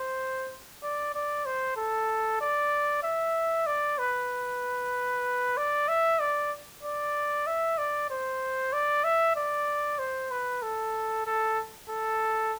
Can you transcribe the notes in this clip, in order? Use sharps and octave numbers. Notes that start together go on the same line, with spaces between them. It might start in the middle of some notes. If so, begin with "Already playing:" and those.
Already playing: C5
D5
D5
C5
A4
D5
E5
D5
B4
D5
E5
D5
D5
E5
D5
C5
D5
E5
D5
C5
B4
A4
A4
A4